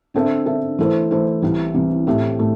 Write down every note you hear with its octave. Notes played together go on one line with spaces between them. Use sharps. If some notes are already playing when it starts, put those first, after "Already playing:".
D3 C4 A4 E5
D3 C4 A4 E5
E3 A3 E4 A4 C5
E3 A3 E4 A4 C5
C2 C3 E3 C4
C2 C3 E3 C4
A2 A3 C4 G4 E5
A2 A3